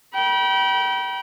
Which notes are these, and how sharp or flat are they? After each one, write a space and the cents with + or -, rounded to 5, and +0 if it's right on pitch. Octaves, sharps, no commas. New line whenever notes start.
G5 -25 B5 -40